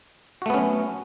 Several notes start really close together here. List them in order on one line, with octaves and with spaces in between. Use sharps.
F#4 A3 B3 C#4 F#3